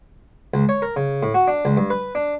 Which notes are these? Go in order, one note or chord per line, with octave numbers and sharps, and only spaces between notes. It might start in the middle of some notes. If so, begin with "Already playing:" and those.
C#2
C#5
A#4
C#3
A2
F#4
D4
C#2
G2
B4
D4